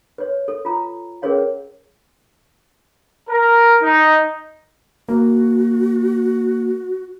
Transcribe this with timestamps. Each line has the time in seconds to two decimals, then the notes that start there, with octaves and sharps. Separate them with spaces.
0.18 B4 C#5
0.48 A4
0.65 F4 A#5
1.22 C#4 G#4 A#4 B4 C#5 F5
3.29 A#4
3.82 D#4
5.09 A#3 F#4